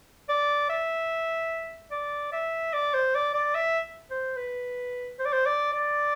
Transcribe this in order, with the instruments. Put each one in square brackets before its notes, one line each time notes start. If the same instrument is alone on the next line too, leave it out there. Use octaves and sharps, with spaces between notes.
[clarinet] D5
E5
D5
E5
D5
C5
D5
D5
E5
C5
B4
C5
D5
C5
D5
D5